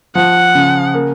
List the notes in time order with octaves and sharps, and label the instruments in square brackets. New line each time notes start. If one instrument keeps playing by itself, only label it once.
[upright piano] F3 [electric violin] F#5
[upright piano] C#3
A#3